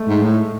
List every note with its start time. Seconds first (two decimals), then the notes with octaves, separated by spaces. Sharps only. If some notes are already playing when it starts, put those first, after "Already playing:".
Already playing: G#3 A3
0.08 G#2
0.23 A2